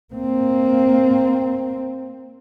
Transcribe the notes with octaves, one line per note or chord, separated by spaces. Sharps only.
A#3 C4